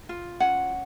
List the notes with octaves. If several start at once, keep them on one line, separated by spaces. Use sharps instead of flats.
F4
C#4 F#5